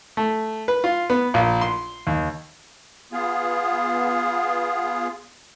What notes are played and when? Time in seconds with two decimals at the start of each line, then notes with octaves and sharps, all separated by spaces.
0.17 A3
0.68 B4
0.84 F4
1.10 B3
1.34 A#1
1.61 C6
2.07 D#2
3.12 B3 F4 G#4